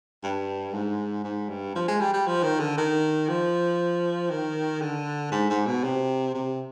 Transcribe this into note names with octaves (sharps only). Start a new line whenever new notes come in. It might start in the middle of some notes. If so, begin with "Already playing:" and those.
G2
G#2
G#2
G2
F3
G#3
G3
G3
F3
D#3
D3
D#3
F3
D#3
D3
G#2
G#2
B2
C3
C3